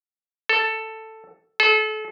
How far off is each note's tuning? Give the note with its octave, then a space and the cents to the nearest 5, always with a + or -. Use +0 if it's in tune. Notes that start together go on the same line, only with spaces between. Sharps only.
A4 +5
A4 -35